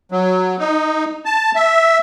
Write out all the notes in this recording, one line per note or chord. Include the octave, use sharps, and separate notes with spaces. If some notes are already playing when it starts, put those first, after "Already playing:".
F#3
D#4
A5
E5